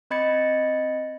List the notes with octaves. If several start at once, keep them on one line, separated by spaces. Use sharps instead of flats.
C4 D#5 B5 G#6 A6 C#7